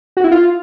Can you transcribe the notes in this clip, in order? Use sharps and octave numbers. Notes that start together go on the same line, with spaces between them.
F#4
E4
F4